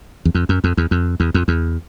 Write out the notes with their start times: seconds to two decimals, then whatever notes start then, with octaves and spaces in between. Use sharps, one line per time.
0.25 E2
0.35 F2
0.49 F#2
0.64 F2
0.77 E2
0.91 F2
1.20 E2
1.34 F2
1.48 E2